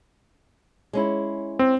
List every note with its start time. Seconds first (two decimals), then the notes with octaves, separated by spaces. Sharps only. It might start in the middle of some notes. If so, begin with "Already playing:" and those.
0.93 G#3 C#4 E4
1.59 C4